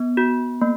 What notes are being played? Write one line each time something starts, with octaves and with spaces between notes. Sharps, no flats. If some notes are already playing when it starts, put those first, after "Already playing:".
Already playing: B3
F#4
A#3